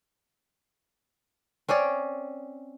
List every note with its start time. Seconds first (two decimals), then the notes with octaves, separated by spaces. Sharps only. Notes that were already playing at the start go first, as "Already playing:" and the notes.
1.68 C4 C#4 C#5 D5